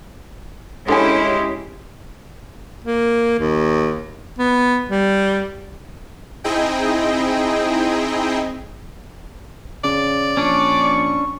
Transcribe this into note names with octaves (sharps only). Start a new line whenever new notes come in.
D3 G#3 C#4 E4 G4 G#5
A#3
D#2
B3
G3
C4 D#4 E4 G#4 D#5 G5
C#3 D5
A#1 C#4 D4 C#6